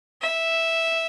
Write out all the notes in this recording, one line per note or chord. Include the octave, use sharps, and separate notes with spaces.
E5